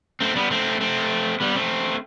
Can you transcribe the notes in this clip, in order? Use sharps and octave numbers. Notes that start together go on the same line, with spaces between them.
A3 C4
G3 B3
A3 C4
A3 C4
G3 B3
A3 C4